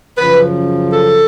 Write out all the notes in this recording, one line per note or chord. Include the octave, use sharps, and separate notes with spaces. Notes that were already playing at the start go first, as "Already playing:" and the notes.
F#2 C#3 F3 B4
A4